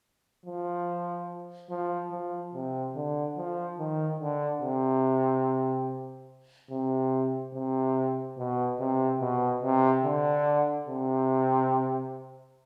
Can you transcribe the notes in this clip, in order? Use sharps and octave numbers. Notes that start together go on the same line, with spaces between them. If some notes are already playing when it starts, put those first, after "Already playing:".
F3
F3
F3
C3
D3
F3
D#3
D3
C3
C3
C3
B2
C3
B2
C3
D3
C3